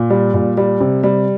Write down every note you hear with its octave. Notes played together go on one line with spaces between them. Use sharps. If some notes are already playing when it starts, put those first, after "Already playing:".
Already playing: A#2
G3
A#2
G3
C3
G3